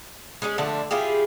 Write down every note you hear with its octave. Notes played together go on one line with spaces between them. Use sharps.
G#3 C#4 D4 G#4
D3 F3 A3 D4
E4 F4 G4 G#4